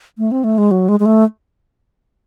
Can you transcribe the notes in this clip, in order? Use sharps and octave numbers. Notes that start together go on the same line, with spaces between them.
A3
C4
A3
G#3
F#3
G#3
G#3
A3